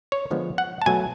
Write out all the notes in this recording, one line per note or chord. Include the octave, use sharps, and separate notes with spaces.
C#5
D3 F3 G#3 B3
F#5
A5
B2 F#3 A3 G#5